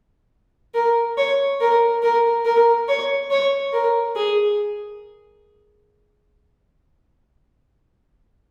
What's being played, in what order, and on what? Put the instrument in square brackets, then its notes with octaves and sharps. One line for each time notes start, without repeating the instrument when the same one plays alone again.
[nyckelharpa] A#4
C#5
A#4
A#4
A#4
C#5
C#5
A#4
G#4